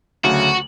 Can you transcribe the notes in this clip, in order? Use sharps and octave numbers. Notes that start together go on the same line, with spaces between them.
D2 C#3 F#3 A3 F#4